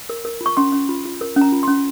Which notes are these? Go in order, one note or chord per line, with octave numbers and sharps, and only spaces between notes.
A#4
A#4
F4
C#6
C#4 C6
C#4
F4
F4
A#4
C#4
A#5
F4
C#4 C6